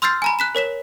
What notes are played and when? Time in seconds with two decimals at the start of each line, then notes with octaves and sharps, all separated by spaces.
0.02 C6 E6 F6 G6 A6 C7
0.22 G#5 A#5 B5
0.39 F#6 B6 E7
0.55 A#4 C#5 B6 E7